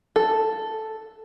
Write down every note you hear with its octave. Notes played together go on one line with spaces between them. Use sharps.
A4